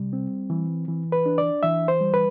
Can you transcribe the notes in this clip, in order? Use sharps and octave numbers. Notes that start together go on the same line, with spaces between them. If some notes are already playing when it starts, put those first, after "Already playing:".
Already playing: C3 G3
C4
E3
E3
B4
D4
D5
E3 E5
C5
G3
B4